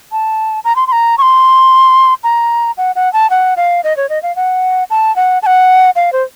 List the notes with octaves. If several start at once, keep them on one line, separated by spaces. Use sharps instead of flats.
A5
A#5
C6
C6
A#5
C#6
C6
A#5
F#5
F#5
A5
F#5
F5
D#5
C#5
D#5
F5
F#5
A5
F#5
A5
F#5
F5
C5